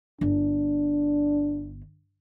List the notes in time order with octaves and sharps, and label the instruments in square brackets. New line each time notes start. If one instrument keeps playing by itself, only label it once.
[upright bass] G1 [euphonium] D4